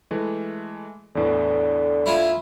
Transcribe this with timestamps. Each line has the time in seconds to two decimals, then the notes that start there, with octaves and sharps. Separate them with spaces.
0.11 E3 G#3 A3
1.15 E2 A2 D3 E3
2.06 E4 F4 G#5